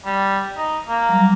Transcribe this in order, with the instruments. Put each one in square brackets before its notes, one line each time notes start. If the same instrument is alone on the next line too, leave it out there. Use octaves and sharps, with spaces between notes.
[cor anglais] G3
D#4
A#3
[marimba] F#3 G3